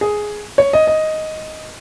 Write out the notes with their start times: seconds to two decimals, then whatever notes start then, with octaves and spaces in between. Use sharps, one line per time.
0.01 G#4
0.58 C#5
0.73 D#5
0.87 D#5